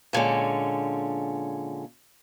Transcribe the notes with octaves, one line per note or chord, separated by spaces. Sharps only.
A#2 D3 G#3 C#4